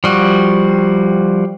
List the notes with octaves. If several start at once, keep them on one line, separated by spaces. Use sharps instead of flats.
F3 G3 F#4